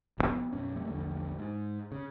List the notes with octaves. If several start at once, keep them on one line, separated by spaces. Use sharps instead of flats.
A#1 C#3 B3
B1 F#2 C#4
G3 A3 A#3
A#1 E2 D3 A3
G#2
C#3